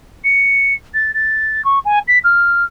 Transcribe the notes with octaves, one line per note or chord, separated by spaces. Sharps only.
C#7
A6
A6
C#6
G#5
B6
F6